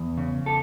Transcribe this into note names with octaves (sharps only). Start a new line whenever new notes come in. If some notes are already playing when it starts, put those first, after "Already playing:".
Already playing: E2
C#3
A4